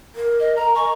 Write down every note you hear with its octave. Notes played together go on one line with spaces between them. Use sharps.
A#4
D#5
A#5
G#5 C#6